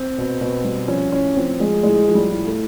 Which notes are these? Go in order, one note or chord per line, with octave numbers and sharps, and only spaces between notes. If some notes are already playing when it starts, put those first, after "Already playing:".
Already playing: C4
B2
B2
G3
F3 C#4
A2 C#4
F3 C4
F3 G#3
A2 G#3
F3
G3
A2
A3